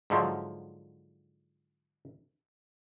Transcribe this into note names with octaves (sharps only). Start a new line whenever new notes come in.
G#2 D3 F3 F#3